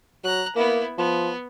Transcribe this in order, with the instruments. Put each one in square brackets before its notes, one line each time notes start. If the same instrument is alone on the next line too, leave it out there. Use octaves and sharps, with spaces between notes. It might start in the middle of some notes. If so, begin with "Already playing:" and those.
[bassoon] F#3 [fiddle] A#5 F#6
[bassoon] A#3 [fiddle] B3 E4
[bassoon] F3 [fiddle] B3